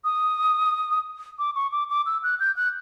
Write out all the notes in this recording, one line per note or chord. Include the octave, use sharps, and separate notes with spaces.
D#6
D6
C#6
D6
D6
E6
F#6
G6
F#6